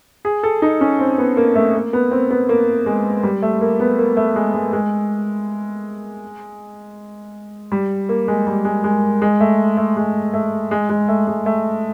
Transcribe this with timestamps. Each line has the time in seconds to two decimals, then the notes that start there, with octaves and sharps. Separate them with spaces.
0.25 G#4
0.43 A4
0.62 D#4
0.81 C#4
0.99 C4
1.18 B3
1.37 A#3
1.56 A3
1.75 A#3
1.93 B3
2.11 C4
2.31 B3
2.49 A#3
2.86 G#3
3.23 G3
3.42 A3
3.61 A#3
3.80 B3
3.99 A#3
4.17 A3
4.36 G#3
4.54 G#3
4.73 G#3
7.72 G3
8.09 A#3
8.28 G#3
8.47 G3
8.65 G#3
8.84 G#3
9.22 G#3
9.40 A3
9.77 A3
9.97 G#3
10.34 A3
10.71 G#3
10.89 G#3
11.09 A3
11.27 G#3
11.46 A3